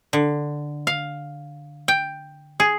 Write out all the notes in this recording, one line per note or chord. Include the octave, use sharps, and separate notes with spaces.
D3
F5
G5
G#4